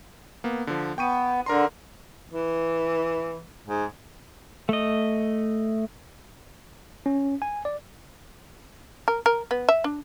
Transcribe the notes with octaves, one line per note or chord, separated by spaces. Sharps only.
A#3 B3
D3 F3
B3 G5 C#6 D#7
D3 A#4 A#5 C6
E3
G#2
A3 D#5
C#4
G#5
D5
A#4
A#4
B3
E5
D4